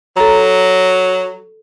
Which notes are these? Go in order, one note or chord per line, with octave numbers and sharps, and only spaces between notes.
F#3 A4 A#5